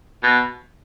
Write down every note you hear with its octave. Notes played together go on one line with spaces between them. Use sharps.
B2